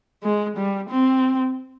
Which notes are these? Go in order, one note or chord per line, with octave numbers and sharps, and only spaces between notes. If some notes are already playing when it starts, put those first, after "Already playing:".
G#3
G3
C4